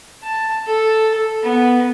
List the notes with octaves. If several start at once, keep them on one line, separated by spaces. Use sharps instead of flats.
A5
A4
B3